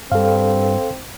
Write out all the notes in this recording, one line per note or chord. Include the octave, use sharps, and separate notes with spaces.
G2 C4 A4 F5